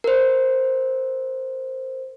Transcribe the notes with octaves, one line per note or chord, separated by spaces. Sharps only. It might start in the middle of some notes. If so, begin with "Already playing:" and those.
A#4 C5